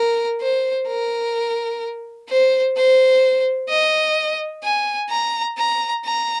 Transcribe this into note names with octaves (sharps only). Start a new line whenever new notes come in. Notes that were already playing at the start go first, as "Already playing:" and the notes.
Already playing: A#4
C5
A#4
C5
C5
D#5
G#5
A#5
A#5
A#5